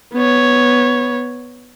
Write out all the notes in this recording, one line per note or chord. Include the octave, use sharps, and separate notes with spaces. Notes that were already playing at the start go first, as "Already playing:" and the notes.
B3 C#5